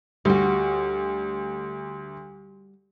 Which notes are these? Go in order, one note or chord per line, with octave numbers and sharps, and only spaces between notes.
D2 G3 F#4